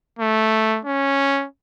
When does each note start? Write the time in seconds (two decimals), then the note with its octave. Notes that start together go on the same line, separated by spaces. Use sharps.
0.19 A3
0.85 C#4